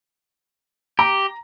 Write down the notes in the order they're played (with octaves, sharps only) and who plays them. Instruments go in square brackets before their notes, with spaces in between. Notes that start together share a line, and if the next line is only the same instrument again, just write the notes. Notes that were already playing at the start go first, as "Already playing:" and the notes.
[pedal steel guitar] G4 [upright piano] A#5